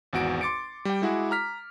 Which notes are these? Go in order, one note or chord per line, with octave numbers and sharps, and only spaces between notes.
G#1 E2 F#4 D7
C6 D6 A6 C#7 D7
G3 G5
G#3 E4 F#4 G#4
A#5 F6 B6